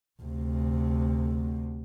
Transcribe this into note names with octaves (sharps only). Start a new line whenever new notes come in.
D2 C3